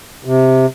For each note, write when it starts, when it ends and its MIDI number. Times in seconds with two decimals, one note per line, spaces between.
0.25 0.66 48